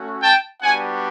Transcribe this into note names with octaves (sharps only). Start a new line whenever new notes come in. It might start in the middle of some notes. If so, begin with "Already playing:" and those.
Already playing: A3 C#4 F#4
G5 A5
G3 B3 D4 F#4 F#5 G#5